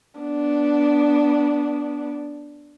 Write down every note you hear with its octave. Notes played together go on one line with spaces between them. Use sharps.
B3 D4